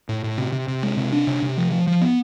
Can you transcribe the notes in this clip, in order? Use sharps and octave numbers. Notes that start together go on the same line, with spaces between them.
A2
A2
C3
C3
C3
G#3
C3
D4
C3
C3
F3
F3
F3
B3